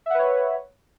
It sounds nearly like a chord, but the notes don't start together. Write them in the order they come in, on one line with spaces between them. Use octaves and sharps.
E5 F#5 B4 C#5